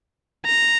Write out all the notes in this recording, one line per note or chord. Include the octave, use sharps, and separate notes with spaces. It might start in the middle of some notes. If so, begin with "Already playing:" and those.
A#5